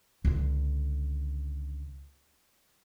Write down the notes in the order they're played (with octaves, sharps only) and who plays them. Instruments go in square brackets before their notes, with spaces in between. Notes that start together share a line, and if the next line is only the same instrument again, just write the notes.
[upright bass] C#2 D3